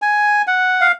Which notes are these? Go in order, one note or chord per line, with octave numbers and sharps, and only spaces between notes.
G#5
F#5
F5